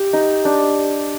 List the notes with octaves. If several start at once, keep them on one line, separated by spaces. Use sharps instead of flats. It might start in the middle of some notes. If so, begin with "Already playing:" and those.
Already playing: G4
D#4
D4